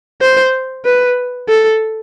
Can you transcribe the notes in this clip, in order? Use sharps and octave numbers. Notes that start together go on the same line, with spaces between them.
C5
B4
A4